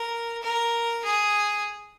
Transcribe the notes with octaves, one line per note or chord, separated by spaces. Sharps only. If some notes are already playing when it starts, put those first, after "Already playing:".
Already playing: A#4
A#4
G#4